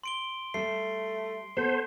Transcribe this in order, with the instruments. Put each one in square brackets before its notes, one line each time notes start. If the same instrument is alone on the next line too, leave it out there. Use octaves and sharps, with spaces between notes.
[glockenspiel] C6 D7 G7
[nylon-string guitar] G3 E5 [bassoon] A3 [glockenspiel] C7
[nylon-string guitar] B3 A4 [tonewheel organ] C5